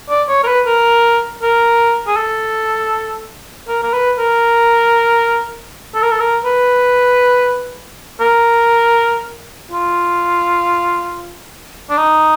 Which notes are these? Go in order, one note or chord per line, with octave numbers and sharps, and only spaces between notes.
D5
C#5
A#4
B4
A#4
A#4
G#4
A4
A#4
A#4
B4
A#4
A4
A#4
A4
A#4
B4
A#4
F4
D4
D#4